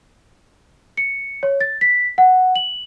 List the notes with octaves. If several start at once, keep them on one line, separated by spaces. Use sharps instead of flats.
C#7
C#5
A6
B6
F#5
F#7